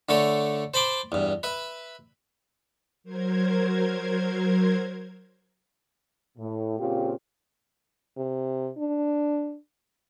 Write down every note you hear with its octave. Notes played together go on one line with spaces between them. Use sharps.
D3 A3 A4 C#5
C5 A5 B5 C6 D6
E2 G2
B4 E5
F#3 A#4 C5 G#6
A2
A#2 C#3 C4 F4 G4
C3
D4